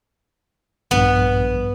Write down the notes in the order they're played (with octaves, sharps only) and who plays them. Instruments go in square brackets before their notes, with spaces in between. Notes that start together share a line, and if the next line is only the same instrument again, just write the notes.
[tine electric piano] A#1 G2 [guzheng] B3